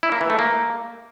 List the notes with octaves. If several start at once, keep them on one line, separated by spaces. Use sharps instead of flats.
E4
A#3
E3
A3
A#3